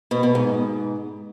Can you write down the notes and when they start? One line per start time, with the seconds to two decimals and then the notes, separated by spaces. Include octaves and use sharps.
0.11 B2
0.23 B2
0.35 G#2